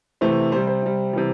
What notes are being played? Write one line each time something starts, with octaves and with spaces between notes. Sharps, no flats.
C3 E3 A3 C5
C3 G3 C5
C5
C3 G3
C3 E3 G3